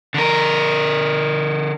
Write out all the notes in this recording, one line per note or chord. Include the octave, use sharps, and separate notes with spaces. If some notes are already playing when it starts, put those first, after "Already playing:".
D3 A#4